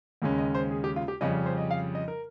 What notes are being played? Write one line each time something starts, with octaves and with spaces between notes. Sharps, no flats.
D#2 C#3 G#3 C#4
D#5
C5
G#4
G4
F4
G4
F2 C#3 G3 C#4 D#5
C5
D#5
F5
D#5
A#4